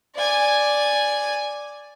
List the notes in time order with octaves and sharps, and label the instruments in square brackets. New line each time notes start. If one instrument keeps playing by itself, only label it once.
[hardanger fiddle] D5 G#5